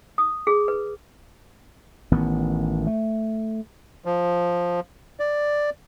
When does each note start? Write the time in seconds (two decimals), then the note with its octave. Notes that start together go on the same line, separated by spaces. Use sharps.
0.18 D#6
0.47 G#4
0.68 B4
2.12 A1 D#3 B3
2.87 A3
4.05 F3
5.20 D5